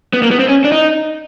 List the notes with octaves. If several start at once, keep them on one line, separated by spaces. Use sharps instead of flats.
B3
A#3
B3
C4
C#4
D4
D#4